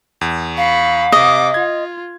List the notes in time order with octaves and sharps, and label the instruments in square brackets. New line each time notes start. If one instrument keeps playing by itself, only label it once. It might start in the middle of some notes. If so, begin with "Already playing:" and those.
[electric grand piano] E2
[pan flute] F5 [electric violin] B5 C#6
[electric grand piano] C3 D#6 [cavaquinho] D#5 [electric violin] D6
[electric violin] F4 [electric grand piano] G#6